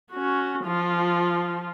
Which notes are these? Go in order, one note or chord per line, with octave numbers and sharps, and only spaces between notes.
C#4 F#4
F3 F4